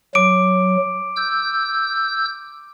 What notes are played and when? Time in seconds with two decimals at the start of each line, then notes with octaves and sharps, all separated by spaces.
0.15 F#3 D6 D7
1.16 E6 G6